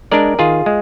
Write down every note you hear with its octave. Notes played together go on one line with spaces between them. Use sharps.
G#3 D4 A#4 D5
D#3 F4 G#4
G#3